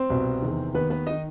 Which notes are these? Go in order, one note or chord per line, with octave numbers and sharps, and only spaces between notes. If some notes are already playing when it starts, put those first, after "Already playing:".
Already playing: C4 C5
C2 B2
E2 C3 D#3
D#2 D#3 B3 B4
B3 B4
D#3 D#4 D#5